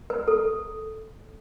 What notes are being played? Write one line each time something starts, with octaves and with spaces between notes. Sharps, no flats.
B4
A4